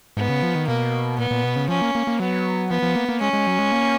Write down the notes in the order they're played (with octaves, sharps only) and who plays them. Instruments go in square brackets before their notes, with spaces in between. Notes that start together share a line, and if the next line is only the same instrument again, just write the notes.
[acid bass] G#2 [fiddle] B3
[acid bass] C#3
F3
D#3
[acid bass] B2 [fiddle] A#3
[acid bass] A#2 [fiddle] B3
[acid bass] A#2
B2
C#3
[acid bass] F3 [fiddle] C#4
[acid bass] A#3
A#3
A#3
[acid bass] F#3 [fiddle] B3
[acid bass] F3 [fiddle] B3
[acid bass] F3
A#3
A#3
[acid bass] G#3 [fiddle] C#4
[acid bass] G#3
F#3
G#3
A#3